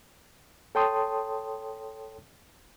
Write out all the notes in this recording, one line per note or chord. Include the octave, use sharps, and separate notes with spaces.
A4 C#5 G5 A5 C6 D#6